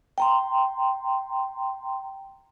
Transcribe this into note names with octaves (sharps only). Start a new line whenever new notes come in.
G5 A#5 C6